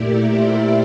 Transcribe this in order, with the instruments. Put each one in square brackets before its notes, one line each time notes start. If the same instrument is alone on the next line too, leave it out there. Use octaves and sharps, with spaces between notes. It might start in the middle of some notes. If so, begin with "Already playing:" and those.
Already playing: [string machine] A#2 A3 E4 G4 A#4 D5
C5 E5